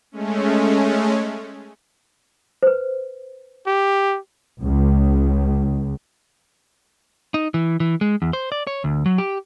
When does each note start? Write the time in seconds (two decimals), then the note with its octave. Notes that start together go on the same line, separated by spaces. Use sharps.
0.12 G#3 A3 C#4
2.63 B4 C5
3.67 G4
4.62 C#2
7.34 D#4
7.54 E3
7.80 E3
8.01 G#3
8.22 E2
8.33 C5
8.52 D5
8.67 C#5
8.84 D2
9.06 F#3
9.18 G4